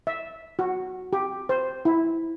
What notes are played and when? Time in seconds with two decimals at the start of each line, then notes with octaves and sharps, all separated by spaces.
0.07 E5
0.59 F#4
1.13 G4
1.49 C5
1.85 E4